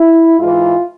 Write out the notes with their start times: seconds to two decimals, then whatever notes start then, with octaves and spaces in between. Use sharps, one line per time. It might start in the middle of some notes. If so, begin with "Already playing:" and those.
Already playing: E4
0.40 G#2 E3 F4